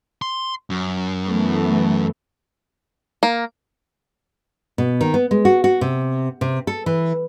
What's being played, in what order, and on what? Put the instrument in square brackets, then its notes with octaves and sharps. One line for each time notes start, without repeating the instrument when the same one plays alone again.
[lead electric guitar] C6
F#2
[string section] E3 A3 B3
[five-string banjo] A#3
[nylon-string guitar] B2
D#3
B3
G#3
F#4
F#4
C3
C3
A4
E3